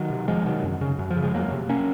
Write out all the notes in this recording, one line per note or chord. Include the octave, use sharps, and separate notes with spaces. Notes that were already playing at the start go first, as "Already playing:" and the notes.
Already playing: D#3 F#3
C3
F2 F3 G#3
C3 D#3 F#3
F#2
C#3
F#2
F3
C#3
F3 G#3
F2 F#3 A#3
C3
A#3 C#4